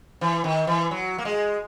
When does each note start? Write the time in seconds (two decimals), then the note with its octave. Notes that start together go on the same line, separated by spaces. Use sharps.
0.21 E3
0.44 D#3
0.67 E3
0.91 F#3
1.19 A#3
1.25 G#3